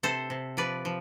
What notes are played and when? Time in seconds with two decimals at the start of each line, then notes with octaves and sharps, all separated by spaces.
0.03 C3 A4 C5
0.30 C3
0.57 F3 B4 D5
0.85 F3